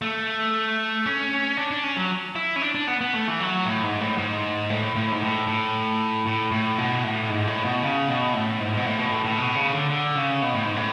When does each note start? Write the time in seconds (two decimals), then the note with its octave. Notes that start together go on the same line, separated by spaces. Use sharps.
0.02 A3
1.06 C#4
1.57 D4
1.71 D4
1.84 C#4
1.96 F#3
2.35 E4
2.56 C#4
2.62 D4
2.75 D4
2.88 B3
3.01 B3
3.13 A3
3.28 E3
3.40 F#3
3.66 A2
3.83 G#2
4.01 A2
4.18 G#2
4.70 A2
4.96 A2
5.12 G#2
5.21 A2
5.47 A2
6.26 A2
6.52 A2
6.78 B2
7.04 A2
7.29 G#2
7.47 A2
7.65 B2
7.82 C#3
8.08 B2
8.34 A2
8.60 G#2
8.77 B2
8.86 A2
8.99 B2
9.12 A2
9.25 A2
9.38 B2
9.55 C#3
9.73 D3
9.90 D3
10.16 C#3
10.42 B2
10.53 A2
10.65 G#2
10.76 A2